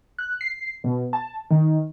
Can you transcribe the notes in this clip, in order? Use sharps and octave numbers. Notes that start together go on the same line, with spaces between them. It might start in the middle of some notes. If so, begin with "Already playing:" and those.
F#6
C7
B2
A5
D#3